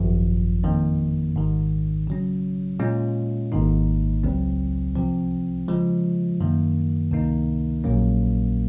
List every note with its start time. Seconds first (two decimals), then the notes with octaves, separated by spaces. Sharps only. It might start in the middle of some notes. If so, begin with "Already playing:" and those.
Already playing: G#1 F#2 F3
0.64 F2 D#3 A#3
1.35 G#1 G#2 D#3
2.07 C#3 F#3 C#4
2.80 A#2 G#3 C#4 F4
3.52 G#1 G#2 D#3 A#3 D#4
4.24 C#2 C#3 F#3 C4
4.96 C2 C3 F3 C4
5.68 C#3 F3 G#3
6.40 F#2 D#3 A#3
7.11 C#2 C3 D#3 A#3 D#4
7.84 A#1 A#2 F#3 A#3 C#4